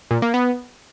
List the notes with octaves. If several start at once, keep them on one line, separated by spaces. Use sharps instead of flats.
A#2
A#3
B3